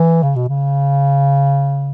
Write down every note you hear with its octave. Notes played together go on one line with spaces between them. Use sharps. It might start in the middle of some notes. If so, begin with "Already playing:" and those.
Already playing: E3
C#3
B2
C#3